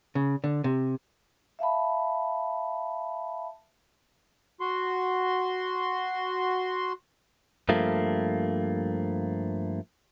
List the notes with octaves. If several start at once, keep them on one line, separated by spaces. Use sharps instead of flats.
C#3
D3
C3
E5 F5 A5 B5
F#4 C6
G2 F3 A3 A#3